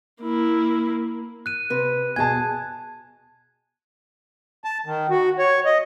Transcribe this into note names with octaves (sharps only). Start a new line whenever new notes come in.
A#3 E4
F#6 D#7
C3 B4
B2 G#4 G#5 A5 G#6
A5
D#3
F#4
C#5
D#5